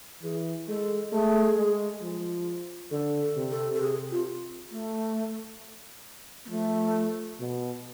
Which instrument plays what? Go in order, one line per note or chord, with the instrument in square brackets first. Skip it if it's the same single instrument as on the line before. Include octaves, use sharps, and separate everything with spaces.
[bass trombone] E3 [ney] G#4
[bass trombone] G#3 [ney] A4
[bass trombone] A3 [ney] G#4
[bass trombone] G#3
F3
[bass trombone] D3 [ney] A4
[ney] A4
[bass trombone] C3
[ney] A4
A4
[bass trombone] C3 [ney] G#4
[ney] F4
A3
B3
[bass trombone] F3 [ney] A3
[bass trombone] B2